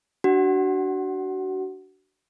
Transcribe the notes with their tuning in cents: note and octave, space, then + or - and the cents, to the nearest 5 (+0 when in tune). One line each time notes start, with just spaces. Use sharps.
D4 +0 F#4 +30 F#5 +10